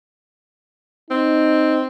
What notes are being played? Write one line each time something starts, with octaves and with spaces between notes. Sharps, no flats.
C4 D#4